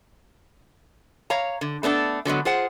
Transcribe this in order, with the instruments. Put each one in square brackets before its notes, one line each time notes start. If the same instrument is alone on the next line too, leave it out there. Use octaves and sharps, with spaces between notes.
[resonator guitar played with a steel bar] C#5 F5 A#5
D3
A3 B3 D4 A4
D3 F#3 G#3 B3
F4 G#4 C5 F#5